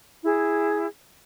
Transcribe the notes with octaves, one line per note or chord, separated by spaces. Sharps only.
E4 G#4